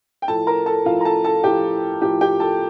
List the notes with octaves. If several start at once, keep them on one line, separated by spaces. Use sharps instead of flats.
G5
A2 F3 A4 A5
A#4 A#5
A4 A5
A2 F3 F4 F5
A#5
A4 A5
A4 A5
A2 F3 G4 G5
A2 F3 G4 G5
G4 G5
A4 A5